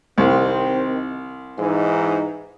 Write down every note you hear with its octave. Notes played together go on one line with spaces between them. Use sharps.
C2 D#3 C4
G#2 E3 D#4